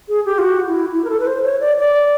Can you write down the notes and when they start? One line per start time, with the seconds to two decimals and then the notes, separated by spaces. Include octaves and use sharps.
0.09 G#4
0.26 G4
0.38 F4
0.42 F#4
0.67 E4
0.93 E4
1.05 A#4
1.10 A4
1.20 B4
1.27 C5
1.44 C#5
1.61 D5
1.77 D5